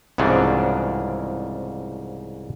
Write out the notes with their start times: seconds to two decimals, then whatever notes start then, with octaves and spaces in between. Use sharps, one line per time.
0.18 C2 G#2 C#3 E3 F3 D4